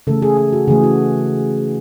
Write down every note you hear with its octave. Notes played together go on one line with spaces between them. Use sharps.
C#3 E3 A3 A4
G#4
G#4
F#4
C#3 E3 A3 G#4
F#4